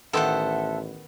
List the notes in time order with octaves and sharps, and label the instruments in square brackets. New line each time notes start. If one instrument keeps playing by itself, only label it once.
[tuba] A1 [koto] D#3 B3 [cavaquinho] A4 C5 F#5 [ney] E5